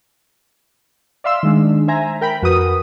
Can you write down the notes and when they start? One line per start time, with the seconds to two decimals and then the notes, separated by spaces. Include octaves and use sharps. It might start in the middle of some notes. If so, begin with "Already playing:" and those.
1.24 D5 E5 F5 C6 E6
1.43 D#3 G#3 D4
1.88 C5 E5 G#5 A#5
2.21 A#4 G5 A#5 B5
2.42 F2 F#4 A#4 B4 D#6